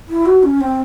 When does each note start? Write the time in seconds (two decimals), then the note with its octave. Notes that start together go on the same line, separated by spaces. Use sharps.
0.09 E4
0.26 F#4
0.43 C#4
0.61 C4